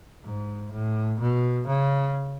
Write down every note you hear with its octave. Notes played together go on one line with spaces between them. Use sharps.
G#2
A2
B2
C#3